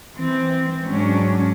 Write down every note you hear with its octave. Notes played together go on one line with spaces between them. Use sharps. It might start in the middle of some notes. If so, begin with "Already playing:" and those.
E3 C4
G#2 F#3 C#4 D4